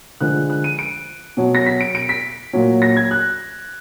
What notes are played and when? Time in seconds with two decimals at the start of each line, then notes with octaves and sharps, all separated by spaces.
0.21 D3 F3 G#3 F#6
0.50 F#6
0.64 D#7
0.79 D7
1.37 B2 F#3
1.55 A#6
1.66 B6
1.81 D7
1.95 D7
2.09 B6
2.53 A#2 F#3
2.82 A#6
2.96 G#6
3.11 F#6